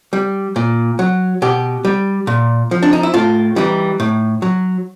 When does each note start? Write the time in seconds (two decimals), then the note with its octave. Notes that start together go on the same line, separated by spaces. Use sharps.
0.13 G3
0.56 A#2
0.99 F#3
1.42 B2 G4
1.85 G3
2.27 A#2
2.71 F3
2.83 D4
2.93 D#4
3.03 E4
3.14 A2 F4
3.56 E3 G3 D#4
4.00 A2
4.42 F#3